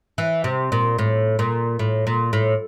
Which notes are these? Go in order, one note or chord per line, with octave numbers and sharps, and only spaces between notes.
E3
C3
A#2
A2
A#2
A2
A#2
A2